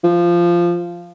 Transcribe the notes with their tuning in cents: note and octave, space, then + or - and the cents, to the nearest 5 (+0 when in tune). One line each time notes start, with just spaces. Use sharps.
F3 -10